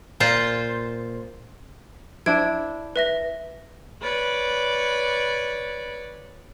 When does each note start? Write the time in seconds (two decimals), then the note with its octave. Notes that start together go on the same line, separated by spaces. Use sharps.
0.20 A#2 F4 C5
2.26 D4 E4 C5 G#6 D7
2.96 B4 E5 A#6
4.01 B4 C#5 D5